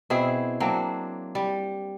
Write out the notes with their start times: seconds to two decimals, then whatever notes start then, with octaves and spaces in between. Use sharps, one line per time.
0.10 B2 C4 E4 G#4
0.60 F#3 A#3 C4 D4
1.35 G3